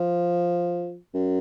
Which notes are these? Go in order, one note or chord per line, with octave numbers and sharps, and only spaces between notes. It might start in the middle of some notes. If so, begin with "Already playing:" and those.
Already playing: F3
F#2